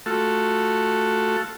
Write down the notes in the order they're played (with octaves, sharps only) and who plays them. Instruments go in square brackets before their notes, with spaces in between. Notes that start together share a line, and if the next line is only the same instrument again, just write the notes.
[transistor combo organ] A3 F4 F#4 A4